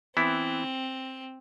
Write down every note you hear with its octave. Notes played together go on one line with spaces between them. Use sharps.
E3 B3 C4 E4